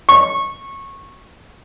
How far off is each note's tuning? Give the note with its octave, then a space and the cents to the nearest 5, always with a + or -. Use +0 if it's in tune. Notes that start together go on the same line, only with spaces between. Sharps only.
C#6 -20